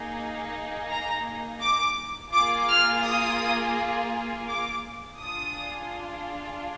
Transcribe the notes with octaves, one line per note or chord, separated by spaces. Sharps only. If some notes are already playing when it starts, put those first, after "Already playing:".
Already playing: A#3 D#4 G#4
A#5
D6
A#3 F4 G#4 D6
F6
D#6
D6
D4 F4 G#4 D#6